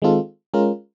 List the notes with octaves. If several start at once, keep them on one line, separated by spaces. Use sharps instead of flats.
D#3 G#3 C4 F4 A4
G#3 C#4 F4 A#4